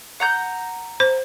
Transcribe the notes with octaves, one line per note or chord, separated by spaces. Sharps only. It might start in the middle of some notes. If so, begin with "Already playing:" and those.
F#5 A#5 G6
C5